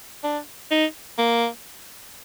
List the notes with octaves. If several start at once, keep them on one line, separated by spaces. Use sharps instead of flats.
D4
D#4
A#3